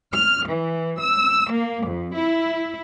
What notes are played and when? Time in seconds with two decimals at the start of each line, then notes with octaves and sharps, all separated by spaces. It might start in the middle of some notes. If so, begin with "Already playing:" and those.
0.13 F6
0.48 E3
1.00 E6
1.51 A#3
1.85 F2
2.15 E4